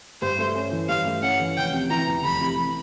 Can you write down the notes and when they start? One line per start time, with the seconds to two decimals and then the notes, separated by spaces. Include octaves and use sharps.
0.22 G2 C5
0.39 A3
0.55 C#4
0.72 E3
0.89 G2 F5
1.05 A3
1.22 C#4 F#5
1.40 E3
1.57 F1 G5
1.73 C3
1.90 E3 A#5
2.07 E2
2.23 F1 B5
2.40 C3
2.58 E3